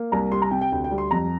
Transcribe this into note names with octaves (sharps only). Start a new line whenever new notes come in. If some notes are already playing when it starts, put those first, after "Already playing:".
Already playing: A#3
C2 A#5
G3 C6
A#5
C3 G5
G5
D2 G5
G5
G3
C6
F2 A#5